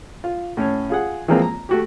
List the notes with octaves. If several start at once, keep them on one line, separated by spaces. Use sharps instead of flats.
F4
A2 C#4 C#5
F4 G#4 F#5
E3 F3 G#3 A#3 C4 F4
A#5
A3 F#4 G4